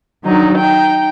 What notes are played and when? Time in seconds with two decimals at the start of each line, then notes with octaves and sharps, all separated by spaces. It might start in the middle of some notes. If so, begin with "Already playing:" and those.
0.24 D#3 F#3 D4 D#4
0.59 D#4 G5